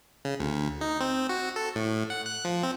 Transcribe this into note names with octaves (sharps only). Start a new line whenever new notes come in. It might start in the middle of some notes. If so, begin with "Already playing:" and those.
C#3
D2
D#4
C4
F#4
A4
A2
F#5
F#6
F3
C4